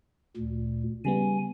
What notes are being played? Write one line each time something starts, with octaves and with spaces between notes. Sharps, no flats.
D2 A#2
C#3 G3 B3 G#5